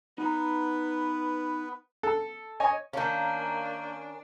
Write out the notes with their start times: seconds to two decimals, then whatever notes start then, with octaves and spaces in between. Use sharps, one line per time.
0.18 B3 D#4 B4 A#5
2.03 A4
2.60 C#5 D#5 G#5
2.93 D#3 A#3 C#4 D4 F5 A5 G6